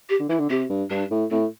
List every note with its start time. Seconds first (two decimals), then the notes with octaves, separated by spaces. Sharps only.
0.09 G4
0.20 D3
0.29 E3 E4
0.39 D3
0.50 C3 G4
0.70 G2
0.90 G2 D4
1.11 A2
1.30 A2 C4